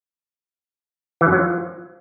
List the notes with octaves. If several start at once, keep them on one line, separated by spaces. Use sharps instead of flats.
E3
F#2
F#3
F3